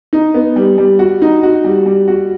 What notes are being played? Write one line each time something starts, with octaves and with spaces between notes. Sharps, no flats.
D#4
B3
G3
G3
F#4
D#4
F#4
G3
G3
F#4